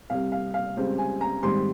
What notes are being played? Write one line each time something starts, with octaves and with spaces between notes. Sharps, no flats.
C2 C3 G3 F5
F5
F5
C#2 C#3 G3 C4
G#5
A#5
G#2 D#3 G3 C4 C6